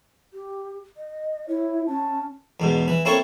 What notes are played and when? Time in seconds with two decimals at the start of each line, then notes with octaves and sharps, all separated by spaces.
0.33 G4
0.97 D#5
1.48 E4 C#5
1.87 C#4 A5
2.60 E2 G#2 B2
2.88 E3
3.05 A#3 C4 E4 A4 C#5